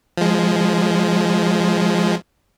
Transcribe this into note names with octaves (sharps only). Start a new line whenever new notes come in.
F3 G#3